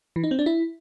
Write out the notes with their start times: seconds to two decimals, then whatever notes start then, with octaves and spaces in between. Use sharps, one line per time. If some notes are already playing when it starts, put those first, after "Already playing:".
0.16 E3
0.24 D#4
0.31 C4
0.39 D4
0.46 E4